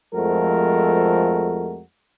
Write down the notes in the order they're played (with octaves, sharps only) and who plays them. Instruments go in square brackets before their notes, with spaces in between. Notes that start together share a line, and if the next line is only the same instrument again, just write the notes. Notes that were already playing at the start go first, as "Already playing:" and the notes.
[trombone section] F2 F3 G#3 A3 F#4 A#4